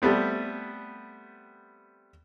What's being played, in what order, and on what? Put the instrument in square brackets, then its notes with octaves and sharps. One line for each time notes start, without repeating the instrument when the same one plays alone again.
[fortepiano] G3 A3 B3 C4